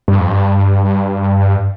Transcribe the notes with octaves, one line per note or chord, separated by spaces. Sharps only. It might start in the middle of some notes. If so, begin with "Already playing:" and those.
G2
F2
G2